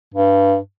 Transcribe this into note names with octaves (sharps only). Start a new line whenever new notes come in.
G2